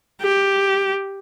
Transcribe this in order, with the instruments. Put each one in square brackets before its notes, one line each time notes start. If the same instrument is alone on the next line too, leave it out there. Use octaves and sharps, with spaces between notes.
[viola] G4